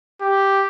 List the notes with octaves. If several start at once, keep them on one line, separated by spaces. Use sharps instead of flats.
G4